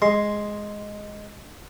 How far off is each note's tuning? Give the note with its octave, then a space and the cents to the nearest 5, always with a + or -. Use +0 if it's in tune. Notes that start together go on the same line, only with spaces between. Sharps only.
G#3 +0 C6 +0